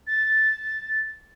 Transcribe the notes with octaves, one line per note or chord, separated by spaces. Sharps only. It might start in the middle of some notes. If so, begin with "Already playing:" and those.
A6